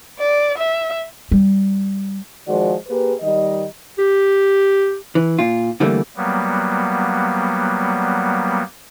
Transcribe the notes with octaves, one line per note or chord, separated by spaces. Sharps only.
D5
E5
G3
D#3 F3 G#3 F#4 C5 D5
A#3 G4 G#4 B4
D#3 G3 D#4 D#5
G4
E3
A#2 F4
D3 E3 G3 A3 A#3
F#3 G3 A#3 B3